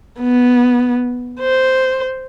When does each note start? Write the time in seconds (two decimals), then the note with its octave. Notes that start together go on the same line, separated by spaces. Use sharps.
0.20 B3
1.40 C5